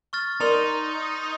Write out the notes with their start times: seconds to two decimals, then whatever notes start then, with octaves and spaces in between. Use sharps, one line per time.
0.13 C#6 F6 A6
0.40 D#4 A#4 D5 A#5 C6 F7